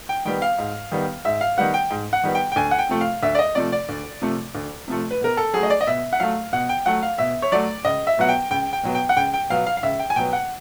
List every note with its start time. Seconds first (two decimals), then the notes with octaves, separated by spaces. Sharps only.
0.09 G5
0.25 D#3 G3 B3 G5
0.42 F5
0.59 G#2
0.92 D#3 G3 B3
1.25 G#2 E5
1.41 F5
1.58 D#3 G3 B3 F#5
1.74 G5
1.91 G#2
2.13 F#5
2.23 D#3 G3 B3
2.35 G5
2.52 G5
2.56 D2 G#5
2.71 F#5
2.79 G5
2.89 C3 F3 A3
3.01 F5
3.23 D2 E5
3.35 D5
3.39 D#5
3.55 C3 F3 A3 D5
3.72 D5
3.89 D2
4.22 C3 F3 A3
4.55 D2
4.88 C3 F3 A3
5.11 B4
5.21 B2 A#4
5.37 A4
5.54 F#3 A3 G#4
5.63 D#5
5.70 D5
5.81 D#5
5.87 B2 E5
6.13 F#5
6.20 F#3 A3 F5
6.53 B2 F#5
6.69 G5
6.86 F#3 A3 F#5
7.03 F5
7.18 B2 E5
7.42 C#5
7.52 F#3 A3 D5
7.85 C#2 D#5
8.07 E5
8.18 B2 F#3 B3 F#5
8.29 G5
8.51 C#2 G5
8.73 G5
8.83 B2 F#3 B3
8.95 G5
9.09 F#5
9.17 C#2 G5
9.34 G5
9.50 B2 F#3 B3 F5
9.67 F5
9.77 F5
9.83 C#2 E5
9.99 G5
10.10 G#5
10.16 B2 F#3 B3 G5
10.33 F#5